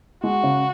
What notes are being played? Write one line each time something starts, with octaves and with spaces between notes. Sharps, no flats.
G#3 F#4
C#3